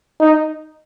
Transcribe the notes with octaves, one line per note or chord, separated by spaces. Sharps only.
D#4